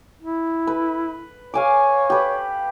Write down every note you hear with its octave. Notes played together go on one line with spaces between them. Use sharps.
E4
B4
C#5 F5 G#5 D6
G4 B4